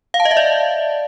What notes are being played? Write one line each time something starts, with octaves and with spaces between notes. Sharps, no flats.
F5
A5
D#5
E5
D5